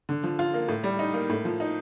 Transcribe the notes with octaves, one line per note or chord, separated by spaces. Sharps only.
D3
F3
F4
A#3
A2
G3
D#4
A#3
A2
F3
D#4